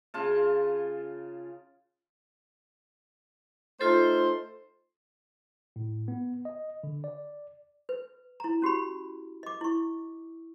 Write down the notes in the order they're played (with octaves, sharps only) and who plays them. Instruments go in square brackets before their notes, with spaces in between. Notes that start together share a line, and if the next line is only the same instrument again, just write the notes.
[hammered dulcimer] C#3 F4 A5
[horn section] A3 D#4 C5 [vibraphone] F4 A4
[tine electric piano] A2
B3
D#5
D3
D5
[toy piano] B4
E4 A#5
C#4 F#4 G4 B5
D#5 D6
E4 C#6